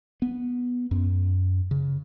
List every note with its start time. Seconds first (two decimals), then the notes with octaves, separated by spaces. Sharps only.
0.22 B3
0.91 F#2
1.71 C#3